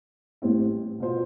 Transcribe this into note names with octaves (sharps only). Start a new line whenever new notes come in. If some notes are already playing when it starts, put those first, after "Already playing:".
A1 A2 G3 C4 E4
B2 B3 F4 C5